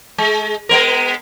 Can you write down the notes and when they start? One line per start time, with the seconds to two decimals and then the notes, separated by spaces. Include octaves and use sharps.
0.18 G#3
0.69 G#3 B3 A#4